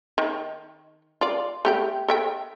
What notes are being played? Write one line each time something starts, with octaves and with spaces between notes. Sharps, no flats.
D#3
F4 D5
A3 G4 G5
A4 E5 G5